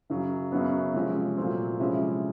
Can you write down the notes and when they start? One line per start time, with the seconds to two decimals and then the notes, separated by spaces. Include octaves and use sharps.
0.10 F#2 C#3 F#3
0.52 F#2 C#3 F#3 B3
0.94 C3 F3 G#3 C#4
1.37 A#2 F#3 A3 C4
1.80 C3 F3 G#3 C#4 E4